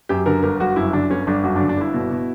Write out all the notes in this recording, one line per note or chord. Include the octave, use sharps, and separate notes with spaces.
F#2 G4
D3 A#4
G1 A#4
G1 F#4
F#2 E4
D3 D4
G1 C#4
G1 D4
F#2 F#4
D4
D3
D4
G1 E4
B2
B2